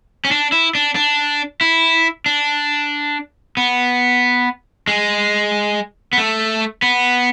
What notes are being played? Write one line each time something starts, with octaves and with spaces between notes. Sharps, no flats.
C#4
D4
E4
D4
D4
E4
D4
B3
G#3
B3
A3
B3